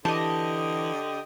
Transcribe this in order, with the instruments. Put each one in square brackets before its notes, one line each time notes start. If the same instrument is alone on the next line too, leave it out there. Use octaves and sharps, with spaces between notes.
[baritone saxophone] D3 [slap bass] E3 [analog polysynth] G4 D#5 [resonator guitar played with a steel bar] A5